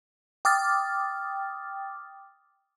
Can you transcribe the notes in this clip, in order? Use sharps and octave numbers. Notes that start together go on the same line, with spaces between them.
G5 D6 D#6 F6 A6